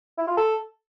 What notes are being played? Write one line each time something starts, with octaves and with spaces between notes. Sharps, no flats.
E4
F4
A4